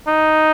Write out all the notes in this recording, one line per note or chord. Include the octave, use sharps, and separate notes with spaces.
D#4